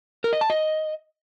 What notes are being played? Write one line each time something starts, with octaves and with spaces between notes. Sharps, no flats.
A#4
D#5
A5
D#5